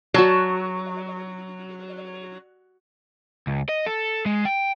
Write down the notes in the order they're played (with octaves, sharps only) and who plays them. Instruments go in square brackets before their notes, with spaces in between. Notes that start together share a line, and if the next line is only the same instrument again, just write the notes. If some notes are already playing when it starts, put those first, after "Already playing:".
[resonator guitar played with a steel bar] F#3 [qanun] F#4 A5
[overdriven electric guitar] C#2
D#5
A4
G#3
G5